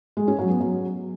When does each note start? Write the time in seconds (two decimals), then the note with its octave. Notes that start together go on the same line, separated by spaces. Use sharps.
0.17 G#3
0.28 C#4
0.39 F#3
0.50 B3
0.60 F#3